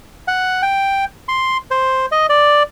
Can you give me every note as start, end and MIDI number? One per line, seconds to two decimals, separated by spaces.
0.28 0.62 78
0.62 1.05 79
1.28 1.58 84
1.71 2.06 72
2.12 2.26 75
2.29 2.63 74